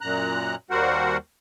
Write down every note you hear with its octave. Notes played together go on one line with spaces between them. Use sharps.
F#2 A#2 A#5 F#6
D#2 G3 F#4 A#4 C5 F#5